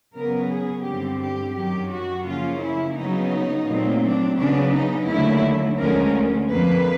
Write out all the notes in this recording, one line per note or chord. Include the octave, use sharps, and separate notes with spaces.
C#3 F#3 B3 A#4
G#4
G2 D3 G3 C4 G4
G4
F#2 D#3 F#3 G4
F#4
C#3 F3 A#3 C#4 F4
E4
C#3 F#3 B3 D#4
A#2 F#3 A3 C4
D4
C#3 F#3 B3 D4
D#4
D#2 D3 F#3 A3 E4
D2 D3 F3 G#3 C#4 A#4
F2 D3 F3 A#3 B4